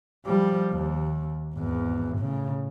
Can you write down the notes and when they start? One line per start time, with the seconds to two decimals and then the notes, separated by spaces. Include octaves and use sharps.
0.26 F3 G3
0.72 D#2
1.55 G#1 E2
2.18 A2 C#3